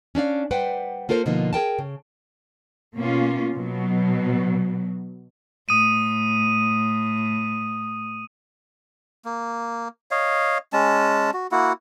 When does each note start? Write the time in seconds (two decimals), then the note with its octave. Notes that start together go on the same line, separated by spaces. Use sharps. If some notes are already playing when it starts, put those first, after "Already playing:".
0.15 C#4 D4 D5 F5
0.51 G3 B4 C5 F#5 G5
1.09 A#3 F4 A4 A#4 C5
1.26 B2 D3 F3 A#3 D#4 F4
1.53 G#4 A#4 G5 A5
1.79 C#3
2.95 B2 A#3 C#4 F4
3.53 B2 F#3
5.69 A2 D#6 D#7
9.25 A#3
10.11 C#5 D#5 F5
10.73 G#3 C#4 A5
11.34 F#4
11.52 A#3 E4 F#4 F#5